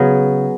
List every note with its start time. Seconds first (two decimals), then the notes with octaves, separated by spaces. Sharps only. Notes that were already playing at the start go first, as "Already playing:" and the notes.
Already playing: C#3 F#3 B3